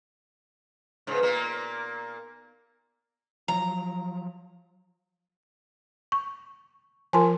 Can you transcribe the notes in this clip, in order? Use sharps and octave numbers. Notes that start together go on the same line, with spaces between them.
G#2 C#3 B3 D#4 G5
A#2 A#3
F3 F#3 A#5
C#6
F3 F4 A#4 G#5 A5 C6